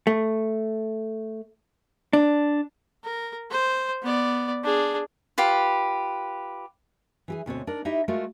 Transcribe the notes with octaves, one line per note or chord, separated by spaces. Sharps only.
A3
D4
A#4
C5
B3 D5
D4 G#4
F4 G4 B4
E3 G4 G#4
D2 B2 C4 C#5
D4 D#4 A#4
D#4 E4 G4 D#5 E5
G#3 A3 F4 F#4 A#4